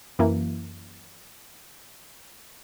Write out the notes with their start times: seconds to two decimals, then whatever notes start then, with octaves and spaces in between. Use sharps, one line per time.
0.19 F#2 E3 A#3